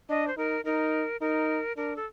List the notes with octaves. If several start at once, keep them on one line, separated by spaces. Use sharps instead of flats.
D4 D#5
C5
D#4 A#4
D#4 A#4
D#4 A#4
D4 A#4
A4